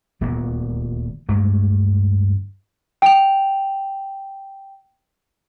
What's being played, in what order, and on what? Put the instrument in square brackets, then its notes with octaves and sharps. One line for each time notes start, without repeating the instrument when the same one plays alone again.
[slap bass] D#1 D2 A#2 B3
D2 G2 G#3 A3
[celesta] G5 F7